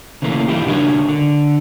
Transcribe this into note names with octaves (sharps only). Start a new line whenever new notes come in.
C#3 E3 A3 A#3
D#3 G3 C4 E4 G4
C#3 D4 F#4 A#4 C#5 G#5
D3